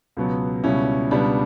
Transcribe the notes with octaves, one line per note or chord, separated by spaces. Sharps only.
C#2 B2 F#3 B3
C#2 B2 G3 C#4 E4
C#2 B2 G3 B3 D4